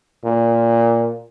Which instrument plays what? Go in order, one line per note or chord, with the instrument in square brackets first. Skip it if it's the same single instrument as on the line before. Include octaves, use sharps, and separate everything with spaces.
[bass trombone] A#2